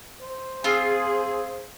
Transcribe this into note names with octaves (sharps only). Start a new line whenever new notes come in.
C5
C4 F4 G#4